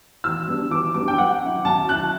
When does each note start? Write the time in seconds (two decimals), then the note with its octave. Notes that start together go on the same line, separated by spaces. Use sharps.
0.24 E3 E6
0.48 G3 B3 D4
0.71 E3 D6
0.95 G3 B3 D4 D6
1.08 G5
1.18 F#3 F#5
1.42 C#4 E4
1.65 F#3 A5
1.88 C#4 E4 F#6